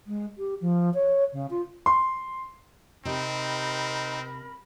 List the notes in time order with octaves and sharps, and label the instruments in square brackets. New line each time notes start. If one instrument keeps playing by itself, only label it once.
[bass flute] G#3
G4
F3
C#5
C#3
F4
[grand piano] C6
[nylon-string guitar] C3 [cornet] C4 [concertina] D#4 [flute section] A#4 B5